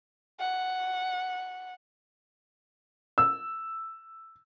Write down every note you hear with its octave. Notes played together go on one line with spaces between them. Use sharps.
F#5
E6